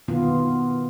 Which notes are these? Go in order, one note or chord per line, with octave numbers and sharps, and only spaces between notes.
B2 D#3 B3 F4